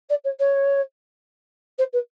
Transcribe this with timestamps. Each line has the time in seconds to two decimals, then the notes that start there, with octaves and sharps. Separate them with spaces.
0.09 D5
0.24 C#5
0.39 C#5
1.78 C5
1.93 B4